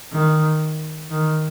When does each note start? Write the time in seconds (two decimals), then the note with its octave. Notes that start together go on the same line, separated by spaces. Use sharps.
0.12 D#3
1.10 D#3